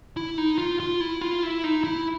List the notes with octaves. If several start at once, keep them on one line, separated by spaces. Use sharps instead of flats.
E4
D#4
F4
F4
E4
F4
E4
D#4
E4